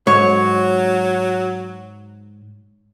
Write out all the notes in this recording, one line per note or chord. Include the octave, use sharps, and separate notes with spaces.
G#2 F#3 C#5